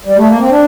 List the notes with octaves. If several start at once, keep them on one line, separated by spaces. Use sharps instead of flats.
G3
A3
A#3
C4
D4